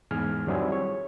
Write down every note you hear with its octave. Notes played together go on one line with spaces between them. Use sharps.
E2 G#2 G#4 G#5 F6
D#3 F#3 G3 C4 E4 G#4
C#5